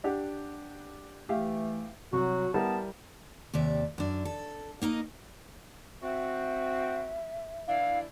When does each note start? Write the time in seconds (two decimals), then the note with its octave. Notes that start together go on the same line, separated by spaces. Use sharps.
0.04 D4 G4 F#5
1.29 E3 A3 G4 E5 F5
2.12 C2 F#3 F#4
2.54 G3 B3 E4 A#4 A5
3.54 D#2 C3 D5 E5
3.98 F#2 D4
4.25 A4
4.82 A#3 D#4 A#4 D#5
6.02 C4 F#4 E5
7.68 E3 D4 E4 F5